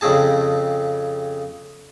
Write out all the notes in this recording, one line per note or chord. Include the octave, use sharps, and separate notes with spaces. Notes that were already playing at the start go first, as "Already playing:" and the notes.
F2 C#3 C4 G#4 A5